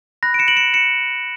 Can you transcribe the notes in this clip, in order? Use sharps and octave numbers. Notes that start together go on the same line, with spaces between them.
B5 F#6 A#6
D7
C#7 E7
D7 F#7
C#7 E7
C#7 E7